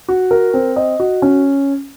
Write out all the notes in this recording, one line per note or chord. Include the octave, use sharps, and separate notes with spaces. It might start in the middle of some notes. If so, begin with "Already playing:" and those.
F#4
A#4
C4
D#5
F#4
C#4